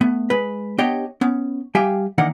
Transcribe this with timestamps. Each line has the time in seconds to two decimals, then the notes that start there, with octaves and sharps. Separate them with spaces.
0.01 A3 B3
0.30 G#3 B4
0.78 B3 D4 G4 C#5 D#5 G5
1.21 B3 C#4
1.75 G3 G4 E5 F5 G5 G#5
2.18 D#3 E3 A#3 D4 D#4 F#5